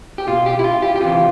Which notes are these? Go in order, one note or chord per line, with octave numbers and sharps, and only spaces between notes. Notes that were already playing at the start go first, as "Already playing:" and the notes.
G4
B2 F4
G4
E4
F4
G4
G4
C3 E3 F4